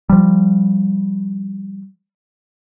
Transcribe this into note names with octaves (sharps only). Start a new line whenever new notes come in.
F3 G3